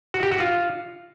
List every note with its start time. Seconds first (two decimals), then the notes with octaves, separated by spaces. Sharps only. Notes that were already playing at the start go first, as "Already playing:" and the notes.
0.14 F#4
0.23 G4
0.31 F#4
0.40 F4